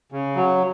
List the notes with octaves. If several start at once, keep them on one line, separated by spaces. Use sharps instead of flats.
C#3
F#3